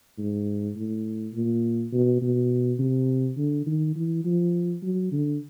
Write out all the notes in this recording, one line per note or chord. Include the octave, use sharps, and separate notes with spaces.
G#2
A2
A#2
B2
B2
C3
D3
D#3
E3
F3
F#3
D3